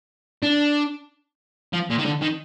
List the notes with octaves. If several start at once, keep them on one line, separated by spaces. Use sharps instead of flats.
D4
F3
A#2
D#3
D3
D#3